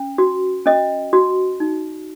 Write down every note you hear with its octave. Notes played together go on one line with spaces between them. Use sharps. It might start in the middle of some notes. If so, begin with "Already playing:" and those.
Already playing: C#4
F#4
C#4 D#5
F#4
D#4